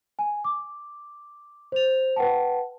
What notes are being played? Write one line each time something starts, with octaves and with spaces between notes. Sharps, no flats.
G#5
D6
C5 F7
B4 F#5 G5 A5